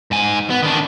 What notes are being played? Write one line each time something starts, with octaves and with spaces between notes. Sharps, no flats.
G#2 G#5
B3
D#3 D4